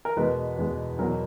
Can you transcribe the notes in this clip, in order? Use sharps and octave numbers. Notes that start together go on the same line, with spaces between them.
A#4
E2 B2 G#3 B4
E2 B2 G#3
E2 B2 F#3 A#4